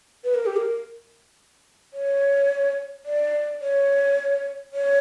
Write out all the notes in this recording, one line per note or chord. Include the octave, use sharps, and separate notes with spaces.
B4
A#4
G4
A#4
C#5
D5
C#5
C#5